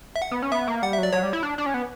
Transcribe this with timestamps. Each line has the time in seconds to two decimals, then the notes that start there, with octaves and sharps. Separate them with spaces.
0.16 E5
0.22 F#5
0.31 B3
0.42 C#4
0.52 B3 E5
0.68 A#3
0.82 G3 F#5
0.93 E5
0.98 F#3 D5
1.13 F#3 C#5
1.23 G3
1.33 E4
1.43 D4
1.58 D4
1.66 C#4
1.74 B3